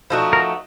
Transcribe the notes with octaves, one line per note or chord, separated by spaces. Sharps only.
F3 A3 D#4 F#4
A#4